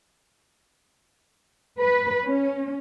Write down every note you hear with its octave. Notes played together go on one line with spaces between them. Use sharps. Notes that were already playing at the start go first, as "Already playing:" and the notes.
B4
C#4